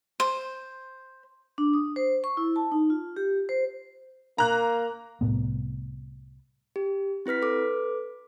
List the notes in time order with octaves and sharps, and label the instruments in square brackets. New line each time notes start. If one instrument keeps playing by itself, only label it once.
[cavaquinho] C5
[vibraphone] D4
D#6
C5
C#6
E4
A5
D#4
F4
G4
C5
[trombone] A#3 [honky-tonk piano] A#5 F#6
[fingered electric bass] C2 A2 B3
[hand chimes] G4
C4 E4 B4 F6 B6
A4 B4 D6